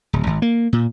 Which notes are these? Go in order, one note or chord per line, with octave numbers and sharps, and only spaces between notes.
D1
G#1
A#3
A#2